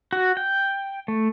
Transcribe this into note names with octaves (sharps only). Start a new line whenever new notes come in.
F#4
G5
A3